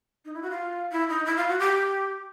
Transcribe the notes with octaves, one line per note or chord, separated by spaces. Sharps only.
D#4
E4
F#4
F4
E4
D#4
E4
F4
F#4
G4